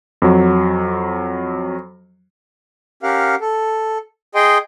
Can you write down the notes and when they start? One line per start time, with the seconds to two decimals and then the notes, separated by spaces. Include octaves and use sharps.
0.22 F2 F#3
3.03 C#4 G4 A#4 F5 F#5
3.41 A4
4.35 G#4 D#5 G5 C6